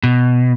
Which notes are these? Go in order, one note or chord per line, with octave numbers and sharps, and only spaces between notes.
B2